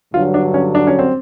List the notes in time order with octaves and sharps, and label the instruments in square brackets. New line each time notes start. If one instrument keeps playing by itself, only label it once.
[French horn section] G2 D3 F#3 [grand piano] F4
[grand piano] D4
C#4
D4
C#4
C4